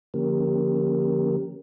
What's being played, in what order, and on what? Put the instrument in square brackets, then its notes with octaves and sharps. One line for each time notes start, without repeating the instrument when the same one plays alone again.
[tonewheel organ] D3 F3 A#3 C#4 G4 A#4